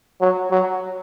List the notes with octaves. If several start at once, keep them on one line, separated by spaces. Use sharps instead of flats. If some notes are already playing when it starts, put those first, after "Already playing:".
F#3
F#3